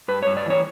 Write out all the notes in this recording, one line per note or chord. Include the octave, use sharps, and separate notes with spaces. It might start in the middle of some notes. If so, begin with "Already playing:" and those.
G2 B4
G2 C#5
D5
E3 C#5